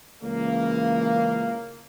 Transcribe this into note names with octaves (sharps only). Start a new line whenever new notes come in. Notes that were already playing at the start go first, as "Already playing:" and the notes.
C#2 C#3 E3 A#3